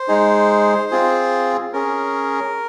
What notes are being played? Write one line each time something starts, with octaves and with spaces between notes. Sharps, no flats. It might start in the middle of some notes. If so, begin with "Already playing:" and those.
Already playing: C5
G#3 D#4 G#4
C4 F4 G#4
C#4 G#4 A#4